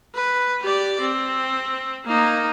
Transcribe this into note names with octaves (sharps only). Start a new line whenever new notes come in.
B4
G4 D5
C4
A#3 D#4